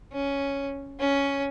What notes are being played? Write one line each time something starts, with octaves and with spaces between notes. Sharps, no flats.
C#4
C#4 C#5